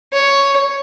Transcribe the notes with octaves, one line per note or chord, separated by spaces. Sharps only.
C#5